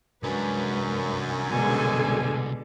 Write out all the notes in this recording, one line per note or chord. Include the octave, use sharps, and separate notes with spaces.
C2 F#2 G#3 D4 B4
B2 D3 G#3 A4 G#5